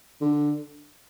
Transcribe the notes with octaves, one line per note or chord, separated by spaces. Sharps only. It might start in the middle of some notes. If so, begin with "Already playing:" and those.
D3